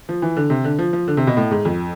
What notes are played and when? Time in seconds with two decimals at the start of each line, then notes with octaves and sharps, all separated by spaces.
0.09 F3
0.22 E3
0.37 D3
0.50 C3
0.64 D3
0.79 F3
0.93 F3
1.08 D3
1.17 C3
1.27 B2
1.37 A2
1.51 G#2
1.65 F2